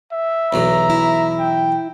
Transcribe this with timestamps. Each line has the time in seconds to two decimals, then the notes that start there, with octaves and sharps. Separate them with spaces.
0.12 E5
0.53 B1 E2 F#3 A#5
0.90 E4
1.40 G5